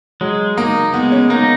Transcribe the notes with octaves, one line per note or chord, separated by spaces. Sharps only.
F#3 G#3
A#3 D#4
G#3 B3
C#4
A#3 D#4